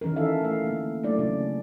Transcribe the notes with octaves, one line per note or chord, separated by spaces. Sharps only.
D#3 E3 C#4 D#4 A#4
E4 A4 E5 F5
A3 E4 F5
D3 A#3
F#3 A3 D4 E4 D5
C#3 A3 A#3 C#4 D4